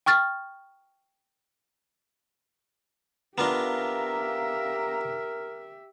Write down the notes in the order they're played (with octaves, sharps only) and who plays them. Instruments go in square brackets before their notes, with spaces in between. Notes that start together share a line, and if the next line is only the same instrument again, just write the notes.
[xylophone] G5 C#6 F6 A6
[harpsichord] B3 D4 F4 [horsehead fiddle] G4 E5 [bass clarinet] A#4 [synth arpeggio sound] F5 A#5